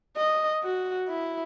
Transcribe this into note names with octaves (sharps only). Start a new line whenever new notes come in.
D#5
F#4
E4